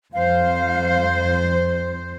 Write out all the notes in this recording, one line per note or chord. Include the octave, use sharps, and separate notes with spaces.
F2 C5 F5